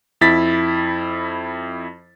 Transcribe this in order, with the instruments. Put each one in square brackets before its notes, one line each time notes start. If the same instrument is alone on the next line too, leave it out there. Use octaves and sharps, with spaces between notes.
[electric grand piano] F2 E4 A6 B6